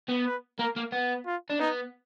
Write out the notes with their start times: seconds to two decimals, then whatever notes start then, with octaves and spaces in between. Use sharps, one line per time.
0.09 B3
0.26 B4
0.59 A#3 A#4
0.76 A#3
0.92 B3
1.26 F4
1.50 D4
1.60 B3 D#4